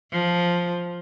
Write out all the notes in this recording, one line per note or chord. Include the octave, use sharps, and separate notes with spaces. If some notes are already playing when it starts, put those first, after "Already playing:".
F3